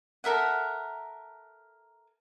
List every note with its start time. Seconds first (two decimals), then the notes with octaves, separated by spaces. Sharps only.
0.24 A4 A#4 E5 F#5